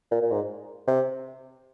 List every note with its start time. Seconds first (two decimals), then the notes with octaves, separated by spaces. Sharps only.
0.11 A#2
0.22 A#2
0.31 G#2
0.87 C3